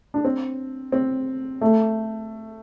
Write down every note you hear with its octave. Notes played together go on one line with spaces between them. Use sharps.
D4
C4
C4
A3